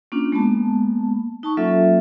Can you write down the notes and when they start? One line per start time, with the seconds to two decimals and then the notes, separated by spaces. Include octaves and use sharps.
0.12 A#3 C#4 D4 F4
0.32 G#3 A#3 B3 A5
1.43 D#4 A5 C#6
1.57 F#3 A#3 C#4 F4 A4 E5